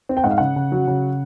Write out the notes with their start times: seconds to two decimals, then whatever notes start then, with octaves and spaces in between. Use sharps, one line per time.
0.09 C4
0.17 G5
0.24 G#2 F#5
0.31 F5
0.38 C#3 F#5
0.56 C#3
0.72 F#3
0.87 C#3